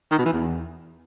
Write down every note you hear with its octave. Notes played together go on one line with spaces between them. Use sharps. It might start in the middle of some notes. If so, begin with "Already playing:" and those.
D#3
B2
E3
E2